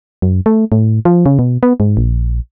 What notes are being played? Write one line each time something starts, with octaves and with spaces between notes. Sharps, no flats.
F#2
A3
A2
F3
C#3
B2
B3
G#2
A#1